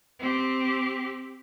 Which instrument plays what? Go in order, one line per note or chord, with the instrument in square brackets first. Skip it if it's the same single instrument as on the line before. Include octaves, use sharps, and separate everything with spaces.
[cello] C4 G4